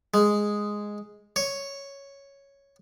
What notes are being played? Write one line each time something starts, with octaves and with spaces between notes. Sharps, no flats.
G#3
C#5